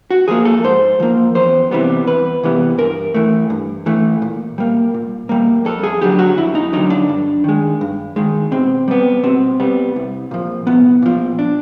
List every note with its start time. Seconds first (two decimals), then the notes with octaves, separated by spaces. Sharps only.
0.11 F#4
0.28 F3 A#3 G#4
0.45 A4
0.64 G#2 C5
1.00 F3 A#3
1.35 E2 C5
1.71 C3 E3 G3 B3
2.07 E2 B4
2.43 C3 E3 G3 B3
2.78 G2 A#4
3.14 E3 A3
3.50 G2
3.86 E3 A3
4.22 A#2
4.58 G3 A#3
4.94 A#2
5.29 G3 A#3
5.65 F2 A4
5.83 G#4
6.01 D3 F#3 G4
6.19 F#4
6.37 F2 E4
6.55 D#4
6.73 D3 F#3 D#4
6.90 D4
7.09 G2
7.44 D#3 G#3
7.81 G2
8.16 D#3 G#3
8.51 B2 C4
8.88 G3 B3
9.23 B2 C4
9.60 G3 B3
9.96 C2
10.31 A#2 F3
10.67 C2 B3
11.02 A#2 F3
11.39 D4